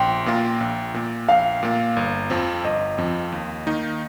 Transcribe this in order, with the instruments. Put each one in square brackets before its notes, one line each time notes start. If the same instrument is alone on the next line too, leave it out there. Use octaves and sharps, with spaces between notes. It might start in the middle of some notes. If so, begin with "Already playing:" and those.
Already playing: [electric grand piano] A#1 [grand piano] G5 C6
[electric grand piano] A#2 A#3 F4 A#4
A#1
A#2 A#3
[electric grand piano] A#1 [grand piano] F5
[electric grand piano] A#2 A#3
G1
F2 F3 C4
[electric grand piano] G1 [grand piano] D#5
[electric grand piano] F2 F3 C4
D#2
D#3 A#3 D#4